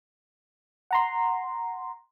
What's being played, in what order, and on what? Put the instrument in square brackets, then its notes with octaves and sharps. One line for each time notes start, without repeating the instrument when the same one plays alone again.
[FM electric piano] F#5 A#5 C6